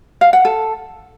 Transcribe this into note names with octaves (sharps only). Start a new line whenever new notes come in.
F5
F#5
A4